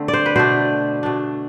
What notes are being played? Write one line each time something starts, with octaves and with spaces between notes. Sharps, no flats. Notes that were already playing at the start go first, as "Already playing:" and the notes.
Already playing: D3 A3 C4
D5
C5
B4
B2 A3 D4 C5
B2 A3 D4